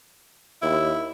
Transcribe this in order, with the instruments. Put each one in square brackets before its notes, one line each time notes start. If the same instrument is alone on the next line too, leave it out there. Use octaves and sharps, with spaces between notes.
[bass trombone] D#2 [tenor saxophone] E4